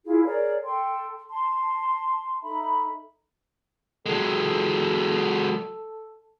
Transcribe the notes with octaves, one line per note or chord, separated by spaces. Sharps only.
E4 F4 G#4
G#4 A#4 C#5 D5
A4 G5 C6
A5 C6
D#4 A4 E5 B5
F#3 G#3 A4